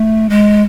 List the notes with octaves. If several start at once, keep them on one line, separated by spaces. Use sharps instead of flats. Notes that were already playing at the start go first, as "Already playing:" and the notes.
Already playing: A3
G#3